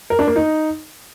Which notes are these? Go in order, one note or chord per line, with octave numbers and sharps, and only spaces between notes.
A#4
D4
A#3
D#4